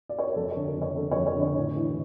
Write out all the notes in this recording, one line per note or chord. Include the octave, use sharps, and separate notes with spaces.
D5
C#5
A#4
F2 A4
D3 C#5
A#4
F2
C#5
D3 A4
C#5
F2
C#5
D3 C#5
A2
E3